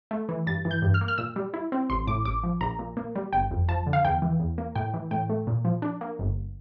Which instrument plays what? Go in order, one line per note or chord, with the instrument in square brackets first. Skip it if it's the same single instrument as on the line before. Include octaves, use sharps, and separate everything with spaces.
[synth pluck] A3
E3
G2 A6
E3
G6
G2
F6
A#3
F6
A#2 E6
G3
E4
C4
A1 C6
A2 D6
A1 D6
F3
A#1 A#5
A#2
A#3
G3
G1 G5
F2
F3 A5
D3
F5
E2 G5
E3
E2
A#3
A2 G5
E3
A2 G5
A3
A#2
F3
D4
A#3
G1